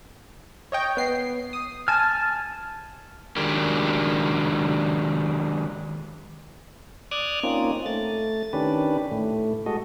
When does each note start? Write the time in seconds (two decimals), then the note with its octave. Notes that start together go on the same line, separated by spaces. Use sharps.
0.72 C#5 D#5 G5
0.97 B3 C7
1.53 D#6
1.88 G#5 A5 F6
3.36 D#3 F#3 G#3 D4 G4 A#4
7.11 D5 D6 D#6 F6 F#6 G#6
7.43 A#3 C4 C#4 D#4 F4
7.86 A3 A6
8.53 D#3 C#4 D4 G4 B4
9.11 A2 A3
9.66 G#3 F#4 A4 D#5